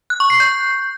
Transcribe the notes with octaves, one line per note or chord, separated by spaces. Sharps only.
F#6
C#6
C7
G6